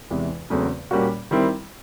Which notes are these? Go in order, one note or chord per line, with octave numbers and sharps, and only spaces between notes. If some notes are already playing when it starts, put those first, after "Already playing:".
E2 C3 E3 G#3
E2 C#3 F#3 A3 C4
A#2 G3 A#3 C#4 F#4
D#3 G3 C4 E4